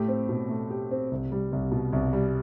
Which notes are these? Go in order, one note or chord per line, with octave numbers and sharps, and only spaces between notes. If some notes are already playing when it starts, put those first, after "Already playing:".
Already playing: A2 A3 G4
C4
B2
A3
G4
C4
C2
G3
C2
B2
C2
G3